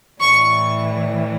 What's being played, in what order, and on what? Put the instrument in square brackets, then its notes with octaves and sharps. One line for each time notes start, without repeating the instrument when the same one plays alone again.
[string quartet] A2 E3 G3 [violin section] C#6